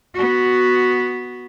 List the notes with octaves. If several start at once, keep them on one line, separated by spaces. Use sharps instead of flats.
B3 F#4